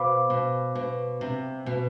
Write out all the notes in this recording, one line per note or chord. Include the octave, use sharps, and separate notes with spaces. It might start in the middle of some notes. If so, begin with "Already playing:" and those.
Already playing: B2 C5 F5 B5 D6
B2
B2
C3
B2